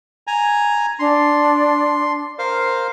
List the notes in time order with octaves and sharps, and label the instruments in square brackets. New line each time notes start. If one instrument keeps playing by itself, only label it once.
[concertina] G#5 A#5
[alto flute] D4 [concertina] C6
[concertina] A#4 C5 F5